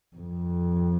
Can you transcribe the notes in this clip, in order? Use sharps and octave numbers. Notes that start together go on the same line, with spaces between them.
F2